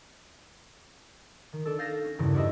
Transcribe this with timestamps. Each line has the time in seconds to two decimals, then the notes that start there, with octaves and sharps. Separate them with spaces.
1.53 D#3
1.65 D4 A4
1.79 F5 G6 A6 A#6 D#7 E7
2.04 C#4
2.18 G#1 E2 G2 C#3 E3
2.34 D4 F#4 G4 B4 D#5 E5